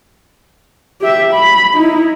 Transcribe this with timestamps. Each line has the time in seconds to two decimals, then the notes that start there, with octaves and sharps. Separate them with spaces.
1.01 G4 E5
1.34 B5
1.74 D#4 E4